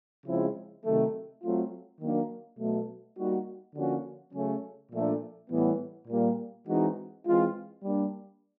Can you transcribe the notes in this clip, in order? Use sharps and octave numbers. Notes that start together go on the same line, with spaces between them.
C#3 F3 G#3 C4 E4
C3 D#3 F#3 A3
F#3 A3 C4 F4
D#3 F#3 A#3 D4
B2 F#3 A3
G3 A#3 D#4 F#4
D3 F3 A#3 C#4 F#4
C#3 F#3 A3 C#4
A#2 F3 A3 D4
A2 E3 G3 B3
A#2 G3 A#3
E3 G#3 C4 D#4 F#4
E3 G#3 C4 F4
G3 A#3 D4